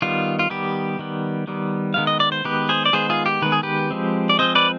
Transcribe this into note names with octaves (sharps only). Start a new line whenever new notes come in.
D#3 G3 B3 F4
F4
D#3 G3 B3 G4
D#3 G3 B3
D#3 G3 B3
D#3 G#3 B3 F5
D#5
D5
C5
D#3 G#3 B3 G4 B4
G#4 C5
D5
D#3 G#3 B3 G#4 C5
F4 G#4
G4
D#3 G#3 B3 B4
G#4
G4 B4
F3 G#3 C4
D5
F3 G#3 C4 C5 D#5
B4 D5